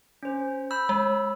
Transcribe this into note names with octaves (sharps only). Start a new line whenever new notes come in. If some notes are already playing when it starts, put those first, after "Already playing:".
C#4 C5
B5 E6 G6
G#3